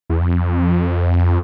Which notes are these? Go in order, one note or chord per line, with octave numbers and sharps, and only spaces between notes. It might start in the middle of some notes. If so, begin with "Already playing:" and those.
E2
F2